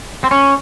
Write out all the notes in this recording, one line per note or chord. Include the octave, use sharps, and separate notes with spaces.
C4
C#4